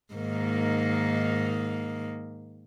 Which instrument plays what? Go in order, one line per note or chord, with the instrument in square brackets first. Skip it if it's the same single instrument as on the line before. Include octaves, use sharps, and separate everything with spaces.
[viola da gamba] G#2 D#3 A#3